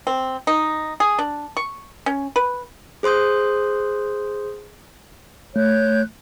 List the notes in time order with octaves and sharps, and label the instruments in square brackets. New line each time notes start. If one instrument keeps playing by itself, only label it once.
[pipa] C4
D#4
G#4
D4
C#6
C#4
B4
[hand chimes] G#4 C5 C6 D#6 G6
[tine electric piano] A3 [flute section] C#5 F#6 G6